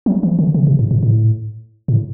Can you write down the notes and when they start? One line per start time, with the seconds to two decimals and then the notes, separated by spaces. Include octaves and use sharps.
0.06 F#3
0.23 E3
0.39 D3
0.54 C#3
0.67 B2
0.79 G#2
0.91 A2
1.03 A2
1.88 A2